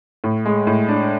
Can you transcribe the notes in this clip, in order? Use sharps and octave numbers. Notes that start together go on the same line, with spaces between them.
A2
G#3
A2
D4